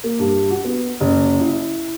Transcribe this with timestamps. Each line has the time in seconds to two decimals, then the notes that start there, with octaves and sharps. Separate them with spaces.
0.04 A#3
0.19 G2
0.50 F#4
0.65 B3
1.01 F#1
1.40 E4